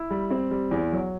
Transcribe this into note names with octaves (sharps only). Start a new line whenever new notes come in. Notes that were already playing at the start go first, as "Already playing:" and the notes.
Already playing: E4
G3
C4
G3
E2
F#3